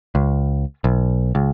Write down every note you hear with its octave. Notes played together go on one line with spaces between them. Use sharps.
C#2
B1
C#2